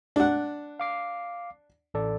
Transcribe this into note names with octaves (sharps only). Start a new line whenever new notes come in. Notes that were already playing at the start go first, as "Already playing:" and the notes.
D4 F#5
F5 D6 C7
A1 A4 D5